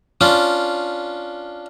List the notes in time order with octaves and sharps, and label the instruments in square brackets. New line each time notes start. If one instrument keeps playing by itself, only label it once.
[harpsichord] C#4 D4 F4